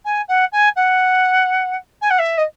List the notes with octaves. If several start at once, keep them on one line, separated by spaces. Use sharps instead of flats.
G#5
F#5
G#5
F#5
G#5
F#5
E5
D#5